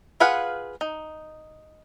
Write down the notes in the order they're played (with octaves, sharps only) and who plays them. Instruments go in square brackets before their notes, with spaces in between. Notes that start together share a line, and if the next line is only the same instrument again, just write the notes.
[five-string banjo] F4 G#4 B4 F5 F#5
D#4